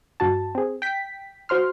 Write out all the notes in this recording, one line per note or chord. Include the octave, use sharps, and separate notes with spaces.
G2 F#4 A5
C4 G#4
G5 B6
F#4 C5 C6 F6